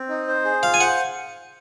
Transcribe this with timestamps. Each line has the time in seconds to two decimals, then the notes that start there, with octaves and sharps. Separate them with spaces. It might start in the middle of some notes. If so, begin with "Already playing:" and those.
Already playing: C4
0.09 D#4
0.27 C5
0.45 G#4
0.63 F4 F5
0.74 G#5
0.80 C5 F#5